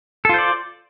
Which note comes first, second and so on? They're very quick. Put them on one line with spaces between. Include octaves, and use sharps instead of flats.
A4 F4 C5 D5